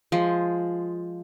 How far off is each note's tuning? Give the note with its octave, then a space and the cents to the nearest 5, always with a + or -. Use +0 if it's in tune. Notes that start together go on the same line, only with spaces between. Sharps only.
F3 +0 G#3 +0